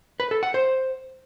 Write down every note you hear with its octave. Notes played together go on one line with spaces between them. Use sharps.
B4
A4
F#5
C5